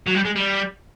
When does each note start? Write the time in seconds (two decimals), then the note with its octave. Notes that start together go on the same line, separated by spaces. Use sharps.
0.08 F#3
0.16 G3
0.26 G#3
0.36 G3